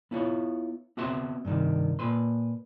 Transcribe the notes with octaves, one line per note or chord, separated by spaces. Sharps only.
B3 E4 F4 C#5
B3 C4 F#4 B4 E5 C6
G2 C3 D#3
A#2 B4 C6